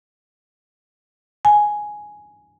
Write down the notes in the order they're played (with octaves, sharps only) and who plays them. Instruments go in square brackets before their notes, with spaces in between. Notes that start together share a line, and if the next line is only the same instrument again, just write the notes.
[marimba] G#5